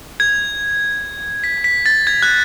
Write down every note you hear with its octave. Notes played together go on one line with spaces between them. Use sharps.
G#6
B6
B6
A6
G#6
F#6